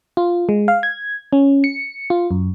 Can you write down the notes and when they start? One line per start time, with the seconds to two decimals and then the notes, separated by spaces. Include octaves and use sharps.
0.17 F4
0.49 G#3
0.68 F5
0.83 G#6
1.33 C#4
1.64 C#7
2.10 F4
2.31 F#2